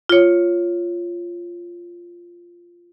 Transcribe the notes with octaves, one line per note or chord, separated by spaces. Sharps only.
F4 C#5